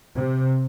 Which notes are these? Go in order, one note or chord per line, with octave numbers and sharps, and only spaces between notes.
C3